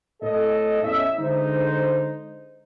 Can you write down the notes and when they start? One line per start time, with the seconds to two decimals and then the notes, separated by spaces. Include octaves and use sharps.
0.21 A2 A4 D#5
0.83 E2 C#4 E5
1.18 D3 G#3 D#4 C5